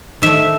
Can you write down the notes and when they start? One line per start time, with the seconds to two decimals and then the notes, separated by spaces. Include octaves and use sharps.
0.22 D#3 A3 E5